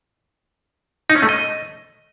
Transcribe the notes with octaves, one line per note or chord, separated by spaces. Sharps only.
D#4
C#4
A3
D#5